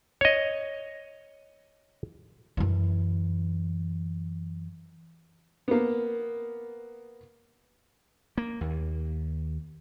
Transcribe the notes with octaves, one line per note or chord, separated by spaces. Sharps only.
C#5 D#5
F#2 E3
A#3 B3
A#3
D#2